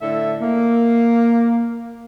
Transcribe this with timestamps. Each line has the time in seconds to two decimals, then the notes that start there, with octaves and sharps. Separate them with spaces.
0.01 A2 D3 A4 E5
0.41 A#3